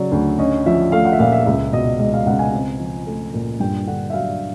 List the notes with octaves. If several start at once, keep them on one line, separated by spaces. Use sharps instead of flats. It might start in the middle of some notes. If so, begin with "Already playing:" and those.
Already playing: C#3 F#3 D5
D2
C#4 D#5
F3 E5
A3 F5
F#5
E5
A#2 F5
E5
C#2 E5
B2 D#5
G#3 D#5
F5
C#2 F#5
G#5
C4
F3
A3
A#2
G2 G5
D3 F#5
E5
F#3 F5